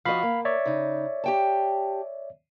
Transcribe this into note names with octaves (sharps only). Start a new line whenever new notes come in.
F3 F#4 D#5 F5 B5
A#3
C#5 D5 E5
C#3 D#4
G4 G5 A5